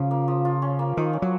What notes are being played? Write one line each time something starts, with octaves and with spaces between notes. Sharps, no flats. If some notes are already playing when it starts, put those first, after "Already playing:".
Already playing: C#3 F3
A#3
F3
F4
C#4
A#3
D#3 F3
C#4
F#3